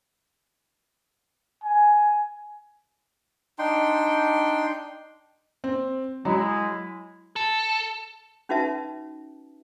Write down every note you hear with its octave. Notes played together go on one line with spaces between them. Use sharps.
G#5
D4 D#4 G5 C6
C4
F#3 G#3 E4
A4
C#4 D#4 F#4 B4 E5 A5